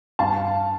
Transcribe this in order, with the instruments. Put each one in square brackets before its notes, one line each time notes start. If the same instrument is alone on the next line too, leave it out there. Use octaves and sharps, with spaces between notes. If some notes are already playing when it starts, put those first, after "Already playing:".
[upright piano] G2 F5 A5